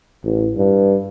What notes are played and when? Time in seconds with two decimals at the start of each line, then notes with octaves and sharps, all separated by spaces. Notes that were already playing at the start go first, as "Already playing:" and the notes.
0.24 A1
0.57 G2